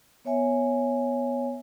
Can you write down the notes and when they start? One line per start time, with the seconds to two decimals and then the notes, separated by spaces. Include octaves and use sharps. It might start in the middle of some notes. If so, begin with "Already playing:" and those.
0.25 B3 C#5 E5 G#5